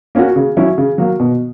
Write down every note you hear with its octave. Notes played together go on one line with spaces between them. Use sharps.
A#3 C#4 F#4
C#3
F#3 C#4 E4
C#3
F#3 A#3
B2